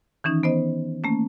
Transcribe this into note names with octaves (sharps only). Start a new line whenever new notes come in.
D#3 E3 C#4 D#4
B3 C5 D#5
A3 A#3 C#4